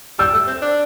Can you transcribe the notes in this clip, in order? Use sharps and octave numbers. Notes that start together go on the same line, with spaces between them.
G3 E6
A3
C4
D4